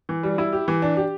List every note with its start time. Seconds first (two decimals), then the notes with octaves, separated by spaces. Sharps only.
0.09 E3
0.23 G3
0.38 E4
0.52 G4
0.68 E3
0.82 D4
0.97 G4